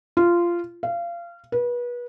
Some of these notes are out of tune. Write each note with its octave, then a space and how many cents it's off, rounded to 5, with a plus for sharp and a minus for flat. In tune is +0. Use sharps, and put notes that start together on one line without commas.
F4 -15
F5 -25
B4 -30